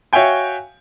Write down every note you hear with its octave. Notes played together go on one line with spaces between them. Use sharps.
F#4 C#5 E5 F5 G5 G#5